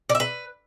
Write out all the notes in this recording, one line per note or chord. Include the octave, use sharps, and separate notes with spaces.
D5
E5
B4